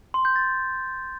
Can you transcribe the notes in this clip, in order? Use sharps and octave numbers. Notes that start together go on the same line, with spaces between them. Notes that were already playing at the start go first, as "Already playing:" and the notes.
C6
G6
A6